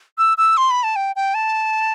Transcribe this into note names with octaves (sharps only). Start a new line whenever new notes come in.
E6
E6
C6
B5
A5
G5
G5
A5